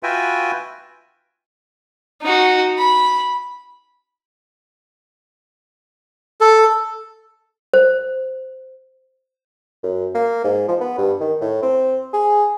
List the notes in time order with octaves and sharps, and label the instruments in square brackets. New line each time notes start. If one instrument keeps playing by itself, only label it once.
[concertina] F4 F#4 B4 E5 G5 G#5
[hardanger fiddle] D#4 F#4
B5
[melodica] A4
[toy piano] C5
[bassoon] F#2
A#3
G#2
F3
B3
G2
D#3
A2
C4
G#4